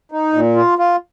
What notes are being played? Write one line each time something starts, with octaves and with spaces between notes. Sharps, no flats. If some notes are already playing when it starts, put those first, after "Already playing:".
D#4
A#2
F4
F4